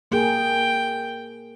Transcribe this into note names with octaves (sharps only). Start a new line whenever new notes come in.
A#3 G#4 A#4 G5